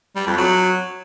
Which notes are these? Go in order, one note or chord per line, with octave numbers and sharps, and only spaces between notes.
G3
F2
F#3